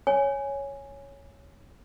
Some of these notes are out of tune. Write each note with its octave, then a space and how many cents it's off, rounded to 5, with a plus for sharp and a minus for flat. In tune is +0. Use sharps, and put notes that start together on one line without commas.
C#5 +0 G#5 +0